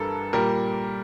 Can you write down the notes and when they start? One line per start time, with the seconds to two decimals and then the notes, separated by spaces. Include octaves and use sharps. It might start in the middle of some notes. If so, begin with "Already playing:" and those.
Already playing: G2 E3 G3 A4 A#4
0.33 A#2 G3 A#4